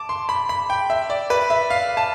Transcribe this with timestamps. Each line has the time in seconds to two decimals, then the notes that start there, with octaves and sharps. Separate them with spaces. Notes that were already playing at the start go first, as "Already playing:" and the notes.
Already playing: A5 D6
0.09 C6
0.29 B5
0.49 B5
0.70 G5
0.90 E5
1.10 D5
1.30 B4
1.50 E5
1.70 F5
1.97 A5